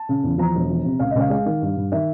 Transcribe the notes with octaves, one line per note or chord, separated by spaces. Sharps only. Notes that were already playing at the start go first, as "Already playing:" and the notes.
Already playing: A5
C#3
E2
F3 A#5
E1
F3
C3
C#2 F5
D#5
C#2 F5
G#3 F5
D#3
G2
G2
D#3 E5